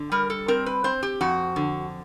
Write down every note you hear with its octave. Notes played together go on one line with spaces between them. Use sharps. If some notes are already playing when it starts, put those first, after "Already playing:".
Already playing: D3
G3 A#4
A4
C4 A#4
B4
C4 C5
G4
F2 F#4
D3